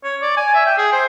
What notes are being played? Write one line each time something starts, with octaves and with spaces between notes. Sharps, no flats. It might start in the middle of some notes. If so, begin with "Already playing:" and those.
C#5
D5
G#5
E5
G5
G#4
C5